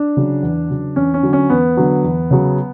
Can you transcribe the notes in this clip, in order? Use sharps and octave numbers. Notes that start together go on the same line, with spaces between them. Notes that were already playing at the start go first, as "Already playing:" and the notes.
Already playing: D4
C#3 F#3
E2
C#3 F#3
E2 C#4
C#4
D3 F#3
C#4
E2 B3
D3 F#3
E2
C#3 F#3